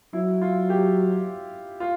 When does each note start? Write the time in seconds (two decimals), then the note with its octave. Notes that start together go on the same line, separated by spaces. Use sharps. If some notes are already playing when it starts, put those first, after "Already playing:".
0.13 F#3 E4
0.41 F4
0.70 G4
1.80 F4